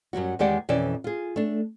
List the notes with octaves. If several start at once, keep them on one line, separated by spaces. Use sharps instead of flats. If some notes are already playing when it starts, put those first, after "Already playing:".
F#2 F#3 G3 F#4
E2 D#3 G#3 G4 D5 F#5
F2 B2 E3 C#4 D5
F4 G#4
A3 D4